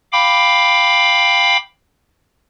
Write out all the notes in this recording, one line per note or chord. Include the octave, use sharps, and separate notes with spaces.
F5 G5 B5 D6